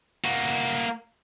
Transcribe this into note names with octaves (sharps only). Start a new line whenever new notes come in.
A#3 F#4